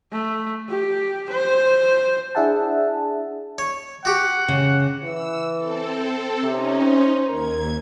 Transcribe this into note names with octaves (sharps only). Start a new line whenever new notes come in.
A3
G4
C5
D4 E4 G#4 E5 F#5 A5
C#5
F#4 G4 F#5
C#3
E3 E6
C4 A4
C3 C#4 D#4
C5
D#2 A#4 G#6